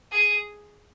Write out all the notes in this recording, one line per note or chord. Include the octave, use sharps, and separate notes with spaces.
G#4